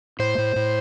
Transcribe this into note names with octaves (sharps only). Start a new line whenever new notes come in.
A2 C5
A2
A2